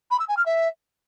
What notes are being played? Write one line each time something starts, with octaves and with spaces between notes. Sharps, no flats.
B5
E6
G#5
F6
E5